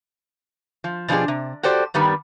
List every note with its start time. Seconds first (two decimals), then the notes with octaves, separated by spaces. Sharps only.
0.84 F3
1.08 B2 F3 D4 G4 G#4
1.28 C3
1.63 F#4 G4 A4 C5 D5
1.94 G2 D#3 G3 B3